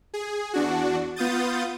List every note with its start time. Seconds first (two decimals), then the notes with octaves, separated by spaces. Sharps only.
0.14 G#4
0.54 E2 D4 F#4
1.16 B3 F4 D#6 G6 A6